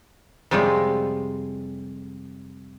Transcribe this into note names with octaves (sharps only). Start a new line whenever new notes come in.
F2 C3 G3 G#3 F4 C#5